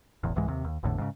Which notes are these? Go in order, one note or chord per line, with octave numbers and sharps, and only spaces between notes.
E1 A1 E2
C2 G#2 E3 G#3
D#2 C3
D#2
G#1 E2 A2 D3
G#2 C#3